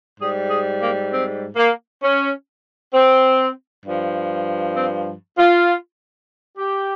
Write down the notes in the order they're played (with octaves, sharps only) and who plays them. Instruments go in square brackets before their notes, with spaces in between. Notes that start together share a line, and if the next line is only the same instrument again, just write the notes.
[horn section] G#2 G3 G#4
G#4
A#3
C4
A#3
C#4
C4
G2 F3
C4
F4
G4